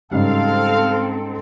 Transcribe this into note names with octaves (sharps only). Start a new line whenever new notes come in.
G#2 C#3 G3 C4 A4 F5